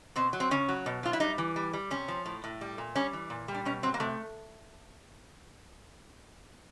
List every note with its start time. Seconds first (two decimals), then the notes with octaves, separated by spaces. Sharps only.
0.16 B2 C4
0.33 F#3
0.40 C4
0.51 C#3 C#4
0.69 F#3
0.86 B2
1.03 F#3 F4
1.13 E4
1.20 G3 D#4
1.38 E3
1.56 G3
1.73 G3
1.91 C3 C#4
2.08 F3
2.26 A2
2.44 A2
2.61 G3
2.78 A#2
2.95 G3 C#4
3.13 E3
3.30 A#2
3.48 G3
3.54 D4
3.65 B2 C#4
3.83 F#3 C4
3.94 A#3
4.00 C3 A3